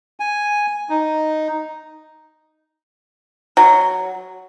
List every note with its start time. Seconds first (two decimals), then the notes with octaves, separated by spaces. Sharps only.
0.20 G#5
0.89 D#4
3.57 F#3